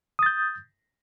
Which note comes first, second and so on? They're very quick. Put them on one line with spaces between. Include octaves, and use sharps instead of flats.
D#6 A6 G6